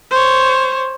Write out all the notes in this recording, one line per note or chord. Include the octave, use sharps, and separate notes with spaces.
C5 C#5